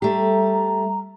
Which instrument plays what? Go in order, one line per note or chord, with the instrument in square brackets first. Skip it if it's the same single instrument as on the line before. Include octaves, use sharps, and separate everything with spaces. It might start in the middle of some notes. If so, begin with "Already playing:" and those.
[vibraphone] G3 E5 [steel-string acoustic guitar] A3 G4 [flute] A#5